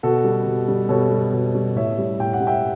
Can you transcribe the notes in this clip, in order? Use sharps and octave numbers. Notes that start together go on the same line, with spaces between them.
B2 F#4 A4
G3
B2
G3
B2 A4 C#5
G3
B2
G3
A2 C#5 E5
G3
A2 G5
F#5
G3
E5 G5